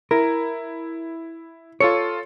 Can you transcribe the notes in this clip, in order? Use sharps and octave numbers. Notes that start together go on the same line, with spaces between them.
E4 A#4
F4 A4 C#5 C#7